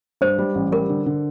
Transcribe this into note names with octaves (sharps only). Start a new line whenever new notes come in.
G2 C5
G3
A1
G3 A#4
D3
D3